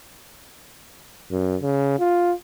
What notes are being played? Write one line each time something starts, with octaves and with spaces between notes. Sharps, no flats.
F#2
C#3
F4